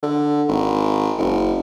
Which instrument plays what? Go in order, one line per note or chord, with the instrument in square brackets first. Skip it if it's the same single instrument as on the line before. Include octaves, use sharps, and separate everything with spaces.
[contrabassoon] D3
G#1
F#1